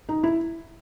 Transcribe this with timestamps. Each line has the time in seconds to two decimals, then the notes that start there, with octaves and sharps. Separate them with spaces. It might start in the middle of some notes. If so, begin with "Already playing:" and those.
0.09 D#4
0.23 E4